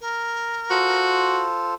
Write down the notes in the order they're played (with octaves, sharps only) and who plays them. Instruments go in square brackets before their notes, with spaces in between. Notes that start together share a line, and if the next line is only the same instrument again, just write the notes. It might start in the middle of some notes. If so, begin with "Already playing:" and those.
[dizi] A#4
[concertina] F4 A4 C5 [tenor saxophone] F#4